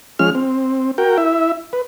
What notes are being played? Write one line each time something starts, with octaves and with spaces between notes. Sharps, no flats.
F3 G#3 C#4 F6
C4
F#4 A#4 G5
E4 E5
B4